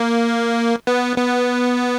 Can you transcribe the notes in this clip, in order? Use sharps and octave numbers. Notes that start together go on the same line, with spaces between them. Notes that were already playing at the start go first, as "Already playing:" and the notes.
Already playing: A#3
B3
B3